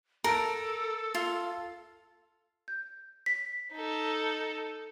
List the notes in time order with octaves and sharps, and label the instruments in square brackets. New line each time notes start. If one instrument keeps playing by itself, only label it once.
[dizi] A4 [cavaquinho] A#4 [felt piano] A5 D7
[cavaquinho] F4
[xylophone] G6
B6
[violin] D#4 A4